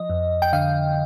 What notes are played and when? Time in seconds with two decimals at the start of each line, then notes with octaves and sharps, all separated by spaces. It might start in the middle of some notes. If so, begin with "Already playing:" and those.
Already playing: F3 D#5
0.10 F2
0.42 G5
0.53 D3 F5